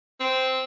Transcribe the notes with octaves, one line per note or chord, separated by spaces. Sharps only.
C4